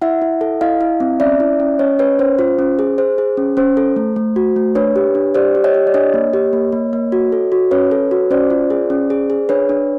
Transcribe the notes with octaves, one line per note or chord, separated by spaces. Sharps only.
E4 E5 F#5
E4
A4
E4 D#5 F5
E4
C4
C#4 D5 E5
E4
C#4
C#4 C#5 D#5
C#4 B4 C#5
C#4 C5
F4 C5
C#4
G#4
G#4 C5
G#4
C#4
C#4 C5
A4
A3
A3
F#4
A3
D4 B4 C#5
G4
D4
G4 C5 D5
G4
C#5 D#5
G4
D5
D4 C#5 D#5
A#3
G4
A#3
A#3
A#3
F#4
A4
F#4
C#4 B4 C#5
A4
F#4
C#4 C5 D5
F4
G#4
C#4
G#4
G#4
D4 B4 C#5
D4